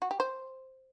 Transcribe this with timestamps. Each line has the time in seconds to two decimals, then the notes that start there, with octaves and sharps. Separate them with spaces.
0.02 F#4
0.11 G4
0.20 C5